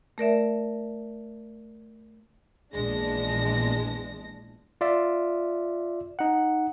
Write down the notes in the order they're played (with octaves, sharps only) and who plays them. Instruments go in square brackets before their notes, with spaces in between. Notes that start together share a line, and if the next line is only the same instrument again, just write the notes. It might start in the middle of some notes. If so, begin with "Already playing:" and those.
[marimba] A3 A#4 D5 E5
[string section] A#1 E2 G#3 D4 A#6
[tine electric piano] F4 D5 E5
D#4 F#5